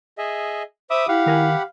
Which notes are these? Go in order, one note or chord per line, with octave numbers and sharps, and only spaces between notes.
G#4 D#5 E5
C5 E5 B5 D6 D#6
E4 G4 F5 F#5 B5
D#3 A#4 G#5